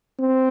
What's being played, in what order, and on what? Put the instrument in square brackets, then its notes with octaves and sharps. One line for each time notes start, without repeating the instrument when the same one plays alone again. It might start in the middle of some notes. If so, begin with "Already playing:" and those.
[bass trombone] C4